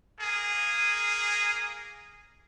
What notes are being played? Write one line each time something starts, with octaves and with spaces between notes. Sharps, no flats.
A#3 G#4